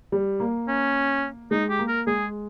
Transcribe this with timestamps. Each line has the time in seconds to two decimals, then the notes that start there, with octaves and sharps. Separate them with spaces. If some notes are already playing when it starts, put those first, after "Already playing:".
0.12 G3
0.40 A#3
0.68 C#4
1.51 G#3 D#4
1.70 G4
1.79 A#3
1.88 A#4
2.07 G#3 G#4